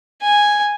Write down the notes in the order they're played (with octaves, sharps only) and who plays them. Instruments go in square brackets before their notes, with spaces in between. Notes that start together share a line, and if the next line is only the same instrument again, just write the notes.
[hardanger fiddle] G#5